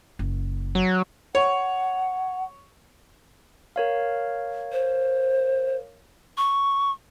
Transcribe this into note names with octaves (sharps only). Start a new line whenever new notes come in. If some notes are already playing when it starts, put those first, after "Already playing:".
F#1
F#3
C#5 F#5
A#4 C#5 F5
C5
C#6